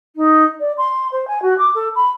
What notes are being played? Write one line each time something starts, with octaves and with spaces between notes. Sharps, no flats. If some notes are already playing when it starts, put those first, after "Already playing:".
D#4
D5
C6
C5
G#5
F#4
D6
A4
B5